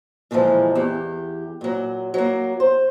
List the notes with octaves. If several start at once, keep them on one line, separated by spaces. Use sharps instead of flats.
A#2 D3 E3 F3 G#3
E2 G4
A#2 F#3
F#3 A#3
C5